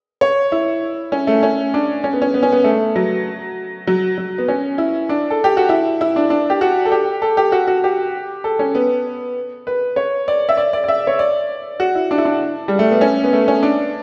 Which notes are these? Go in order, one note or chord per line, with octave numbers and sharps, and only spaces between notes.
C#5
E4
C#4
A3
C#4
D4
C#4
B3
C#4
B3
C#4
B3
A3
F#3
F#3
F#3
B3
C#4
E4
D4
A4
G4
F#4
E4
E4
D4
D4
G4
F#4
A4
G4
A4
G4
F#4
F#4
G4
A4
C#4
B3
B4
C#5
D5
E5
D5
D5
D5
E5
C#5
D5
F#4
E4
D4
E4
D4
G3
A3
B3
C#4
B3
A3
C#4
D4